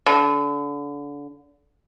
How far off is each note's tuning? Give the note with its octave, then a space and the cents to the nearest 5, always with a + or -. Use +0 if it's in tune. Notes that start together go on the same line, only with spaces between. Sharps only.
D3 -30